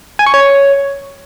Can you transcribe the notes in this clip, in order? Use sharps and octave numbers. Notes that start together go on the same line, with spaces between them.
G#5
C#6
C#5